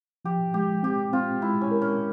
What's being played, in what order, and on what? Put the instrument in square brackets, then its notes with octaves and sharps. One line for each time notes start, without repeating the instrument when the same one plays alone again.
[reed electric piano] F3 [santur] G4
[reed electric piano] G#3 [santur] G4
[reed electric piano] C4 [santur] G4
[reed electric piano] C4 [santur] F4
[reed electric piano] G#3 [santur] E4
[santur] C#4
[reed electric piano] A#4
[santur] C#4